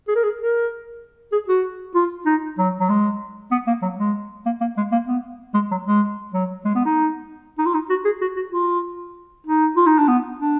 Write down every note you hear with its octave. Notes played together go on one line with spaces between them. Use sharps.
G#4
A#4
G#4
A#4
G#4
F#4
F4
D#4
F#3
F#3
G#3
B3
A#3
F#3
G#3
A#3
A#3
G#3
A#3
B3
G#3
F#3
G#3
F#3
G#3
B3
D#4
D#4
F4
D#4
F#4
G#4
F#4
F#4
F4
D#4
F4
D#4
D4
B3
D4